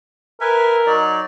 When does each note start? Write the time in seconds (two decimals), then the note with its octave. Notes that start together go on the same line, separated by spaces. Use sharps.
0.41 A#4 B4 E5 G#5
0.86 F#3 D#4 D5